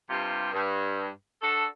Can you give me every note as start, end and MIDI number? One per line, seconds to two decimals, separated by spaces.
0.09 0.51 43
0.09 0.51 48
0.09 0.51 65
0.09 0.51 67
0.53 1.08 43
1.42 1.66 62
1.42 1.66 66
1.42 1.66 69